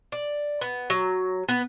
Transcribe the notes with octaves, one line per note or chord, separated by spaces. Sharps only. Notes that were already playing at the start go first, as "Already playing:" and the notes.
D5
B3
F#3
B3